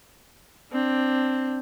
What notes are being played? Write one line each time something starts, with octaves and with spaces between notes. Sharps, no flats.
C4 D4